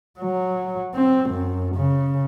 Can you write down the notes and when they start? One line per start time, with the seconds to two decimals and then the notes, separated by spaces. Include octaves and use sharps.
0.20 F#3
0.95 C4
1.30 F#2
1.75 C#3